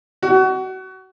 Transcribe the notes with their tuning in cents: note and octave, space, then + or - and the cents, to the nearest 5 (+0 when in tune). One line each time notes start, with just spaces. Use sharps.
F#4 +25